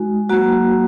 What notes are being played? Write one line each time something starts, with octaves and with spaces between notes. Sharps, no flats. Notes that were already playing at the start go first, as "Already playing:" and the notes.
Already playing: G#3 D#4 F#4
F#3 A#3 D#4 F#4